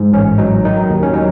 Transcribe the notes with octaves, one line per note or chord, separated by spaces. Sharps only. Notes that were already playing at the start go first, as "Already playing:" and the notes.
Already playing: G#2
A1 C#4
F#3 D#4
D#3 D#4
D#2
C#4
F#3 D#4